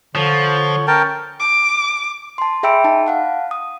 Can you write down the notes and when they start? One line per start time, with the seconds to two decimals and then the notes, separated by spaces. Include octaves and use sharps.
0.15 D3 F3 C#5
0.88 C#4 A#4 G5 A5
1.40 D6
2.38 A5 C6
2.63 G#4 E5 G5 B5 E6 D7
2.84 D#4 A5
3.06 F5 F#5 A5
3.51 D#6